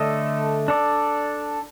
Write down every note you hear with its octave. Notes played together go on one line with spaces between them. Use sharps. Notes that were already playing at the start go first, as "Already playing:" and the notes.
Already playing: D3 A3 D4 A4 D#5
D4 A4 D5